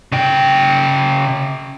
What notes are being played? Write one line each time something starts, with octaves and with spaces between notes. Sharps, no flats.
C#3 G5